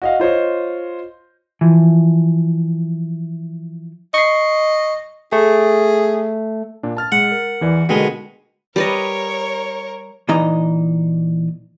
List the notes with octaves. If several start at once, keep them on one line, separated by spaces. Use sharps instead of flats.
F#4 D#5 F5
F4 C5 C#5 D#5
E3 F3
D#5 C#6 C7
A3 G#4
A#2 D4
A5 F6 A6
G#3 F#5
A#4
E2 E3 D5
B2 D3 D#3 G#3
G3 A#4 B4 C#5 D#5
A#2 E3 D#4 D#5 A#5